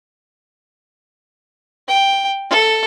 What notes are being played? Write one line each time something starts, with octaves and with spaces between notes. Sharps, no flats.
G5
A4